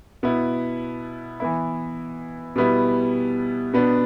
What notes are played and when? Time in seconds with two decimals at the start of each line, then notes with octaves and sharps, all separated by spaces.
0.23 B2 B3 E4
1.40 E3 B3 E4
2.56 B2 G3 B3 E4
3.74 B2 B3 D4